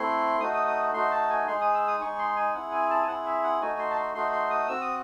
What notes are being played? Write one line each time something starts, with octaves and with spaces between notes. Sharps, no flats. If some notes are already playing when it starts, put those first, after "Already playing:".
Already playing: A3 C4 E4 C6
A3 D#4 F#4 D#6
D#6
D#6
A3 D#4 F#4 C6
A5
G#5
G#3 D#4 G#4 C6
D#6
E6
D#6
G#3 D#4 G#4 C#6
C6
G#5
C4 E4 G#4 F#5
G#5
A5
G#5
C4 E4 G#4 F#5
E5
F#5
A3 D#4 F#4 G#5
C6
A5
C6
A3 D#4 F#4 C6
C6
D#6
C4 F#4 E6
D#6